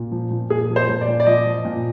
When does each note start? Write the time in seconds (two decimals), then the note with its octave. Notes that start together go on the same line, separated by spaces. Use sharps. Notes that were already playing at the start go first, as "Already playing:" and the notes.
Already playing: A#2
0.12 F3
0.30 A#2
0.50 A#2 G#4
0.70 F3
0.76 C5
0.89 A#2
1.01 D5
1.08 A#2
1.20 D5
1.26 F3 D#5
1.46 F3
1.65 A#2